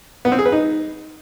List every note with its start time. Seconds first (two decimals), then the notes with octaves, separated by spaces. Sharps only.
0.25 B3
0.32 C4
0.39 G#4
0.45 B4
0.52 D#4